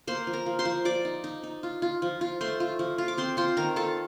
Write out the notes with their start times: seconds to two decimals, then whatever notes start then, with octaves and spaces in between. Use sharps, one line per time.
0.07 A#3 C5 C6
0.27 F3
0.33 A#4 A#5
0.46 F3
0.59 C5 C6
0.65 F3
0.85 F3 D5 D6
1.05 D#4
1.24 D#4
1.43 D#4
1.63 F4
1.82 F4
2.02 F3
2.21 F4
2.41 A3 C5 C6
2.60 F4
2.79 F3
2.98 F4
3.08 D6
3.18 C4 C5 C6
3.37 F4 C5 C6
3.57 D#3 A#4 A#5
3.76 F4 A4 A5